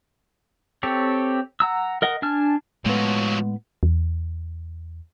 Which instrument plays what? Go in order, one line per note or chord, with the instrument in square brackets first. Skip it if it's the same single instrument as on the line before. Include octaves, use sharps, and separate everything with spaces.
[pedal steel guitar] C4 G4 A4 C#5
F#5 A#5 E6
A#4 D#5 F#5
D4 G#5 A5 F6
[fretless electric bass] A2 B3 [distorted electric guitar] F3 F#3 [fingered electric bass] G#3
[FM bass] E2